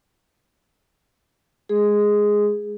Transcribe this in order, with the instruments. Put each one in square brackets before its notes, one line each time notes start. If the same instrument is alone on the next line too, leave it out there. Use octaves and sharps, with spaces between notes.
[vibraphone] G#3 G#4